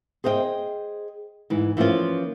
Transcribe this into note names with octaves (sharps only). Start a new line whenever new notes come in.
G#4 C5 D#5 F5 G5
G#2 E3
E3 F3 A#3 C#4 F4